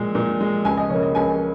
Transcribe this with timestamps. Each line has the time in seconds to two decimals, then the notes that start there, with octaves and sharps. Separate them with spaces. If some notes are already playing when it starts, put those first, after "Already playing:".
Already playing: A#2 G#3
0.15 A#2
0.41 G#3
0.65 C#2 G#5
0.77 D#5
0.90 C#3 A#3 C#5
1.03 D#5
1.15 C#2 G#5